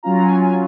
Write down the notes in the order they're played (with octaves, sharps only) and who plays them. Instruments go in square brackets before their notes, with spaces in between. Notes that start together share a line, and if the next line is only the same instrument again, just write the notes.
[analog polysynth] F#3 C#4 F4 A#5
A#5
G#5
G#5